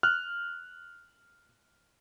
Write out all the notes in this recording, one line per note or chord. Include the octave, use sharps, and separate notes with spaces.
F6 F#6